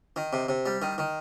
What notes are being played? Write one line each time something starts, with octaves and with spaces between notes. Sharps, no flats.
D#3
C3
C3
G3
D#3
D#3